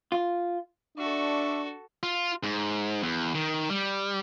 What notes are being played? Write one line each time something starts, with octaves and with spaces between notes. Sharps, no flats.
F4
D4 F#4 A4 D5 E5 C#6
F4
G#2
E2
D#3
G3